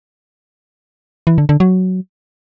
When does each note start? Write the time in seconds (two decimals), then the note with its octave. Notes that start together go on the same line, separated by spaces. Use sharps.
1.27 E3
1.38 D3
1.49 D3
1.60 F#3